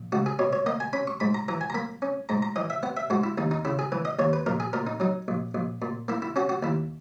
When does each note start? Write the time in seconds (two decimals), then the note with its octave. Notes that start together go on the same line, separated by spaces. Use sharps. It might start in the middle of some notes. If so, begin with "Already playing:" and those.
Already playing: A#1
0.12 C#2 F#4
0.26 G#4
0.39 B2 C#5
0.53 C#5
0.66 A#3 D#5
0.80 G#5
0.93 C#4 B5
1.07 C#6
1.20 G#2 B5
1.34 A#5
1.48 E3 A#5
1.61 G#5
1.70 A#5
1.74 A#3 B5
2.02 C#4
2.29 G#2 A#5
2.42 A#5
2.56 E3 D#5
2.70 E5
2.83 B3 F#5
2.97 E5
3.10 G#2 F#4
3.24 E4
3.38 D#2 D#4
3.51 D#4
3.65 C#3 E4
3.79 G#4
3.92 E3 B4
4.05 D#5
4.19 D#2 C#5
4.33 B4
4.46 A#1 A#4
4.60 G#4
4.73 A#2 A#4
4.87 D#4
5.00 F#3 D#4
5.28 A#1
5.55 A#1
5.82 A#2
6.08 A#3 E4
6.22 E4
6.36 C#4 F#4
6.49 F#4
6.63 D#2 E4